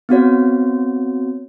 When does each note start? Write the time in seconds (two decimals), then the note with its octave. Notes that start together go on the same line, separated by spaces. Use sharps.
0.09 B3 C4 F#4 C#5